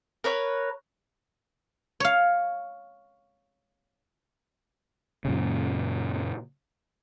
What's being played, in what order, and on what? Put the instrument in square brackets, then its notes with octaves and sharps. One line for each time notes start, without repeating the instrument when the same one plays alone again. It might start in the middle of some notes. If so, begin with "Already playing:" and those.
[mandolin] A#4 B4 C#5
[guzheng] C#5 F5
[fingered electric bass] F#2 A#2 C#3